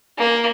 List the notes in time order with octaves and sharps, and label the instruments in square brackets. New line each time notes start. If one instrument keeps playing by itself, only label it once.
[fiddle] A#3